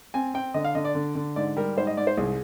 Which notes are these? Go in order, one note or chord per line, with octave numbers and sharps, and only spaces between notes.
C4 G#5
C4 G5
D3 D#5
F5
D3 D#5
D5
D3
D3
G#2 D5
G3 A#4
G#2 C5
D#5
G#2 D5
C5
C2 G#4